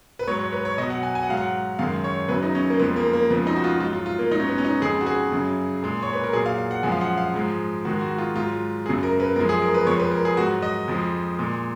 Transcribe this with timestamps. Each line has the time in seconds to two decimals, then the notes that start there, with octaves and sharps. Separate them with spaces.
0.19 B4
0.27 G#2 F#3 C#5
0.39 C#5
0.52 B4
0.65 C#5
0.77 B2 D#5
0.82 F#3
0.90 F#5
1.03 G#5
1.15 G#5
1.23 F#5
1.29 G#2 F#3 F5
1.37 F#5
1.79 F#2 D#3 G#3 F5
2.04 C#5
2.29 F#2 C#3 F#3 B4
2.43 D#4
2.55 C#4
2.70 A#3
2.79 F2 F3 G#3 B3
2.96 A#3
3.13 A#3
3.30 F2 C#3 F3 G#3 B3
3.47 D#4
3.56 F#4
3.64 F4
3.76 F#4
3.80 G#2 F#3 F4
3.93 F4
4.06 F4
4.19 A#3
4.31 G#2 F#3 D#4
4.40 C#4
4.48 B3
4.58 C#4
4.65 D#4
4.82 F2 C#3 G#3 G#4
5.01 F#4
5.06 G#4
5.32 F#2 C#3 F#3
5.83 A#2 G#3
6.03 C#5
6.13 B4
6.24 A#4
6.33 A#2 F#3 G#4
6.46 F5
6.58 F5
6.71 F#5
6.83 F#2 F3 G#3 G#5
6.92 F5
7.01 F#5
7.18 F5
7.34 G#2 F3 G#3
7.85 G#2 D#3 G#3 F#4
8.01 F#4
8.18 F4
8.35 G#2 F#3 F4
8.86 F#3 G#4
8.88 F#2 C#3
9.03 A#4
9.20 B4
9.36 F#2 F3 G#3 A#4
9.49 G#4
9.62 A#4
9.74 B4
9.87 F2 F3 G#3 C#5
9.99 B4
10.12 A#4
10.25 G#4
10.37 G#2 F#3 F#4
10.62 D#5
10.88 F2 F3 G#3
11.39 A#2 G#3